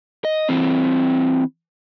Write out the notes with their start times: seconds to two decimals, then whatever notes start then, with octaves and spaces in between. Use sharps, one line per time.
0.25 D#5
0.49 E3 C4